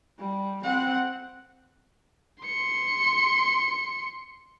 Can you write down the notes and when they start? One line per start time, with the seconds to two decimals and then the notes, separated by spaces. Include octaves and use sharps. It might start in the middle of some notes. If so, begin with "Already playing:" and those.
0.19 G3
0.63 C4 F#5
2.42 C6 C#7